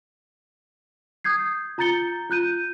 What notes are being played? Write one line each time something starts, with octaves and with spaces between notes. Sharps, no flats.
D#6 G6 G#6 C7
F4 A#5 G6 A6 C#7 G7
F4 F#6 G6 D#7